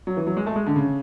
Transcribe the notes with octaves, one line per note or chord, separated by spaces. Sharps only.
F#3
E3
F#3
G#3
A3
G#3
D3
C#3